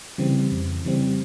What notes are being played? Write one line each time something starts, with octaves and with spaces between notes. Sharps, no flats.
C#3 E3 G3 C4
F2
C#3 E3 G3 C4